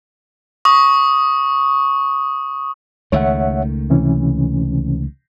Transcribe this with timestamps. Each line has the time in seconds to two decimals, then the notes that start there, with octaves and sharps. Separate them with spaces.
0.65 C#6 D#6
3.12 C#2 D#3 A3 C#5 E5 F#5
3.90 C3 E3 C#4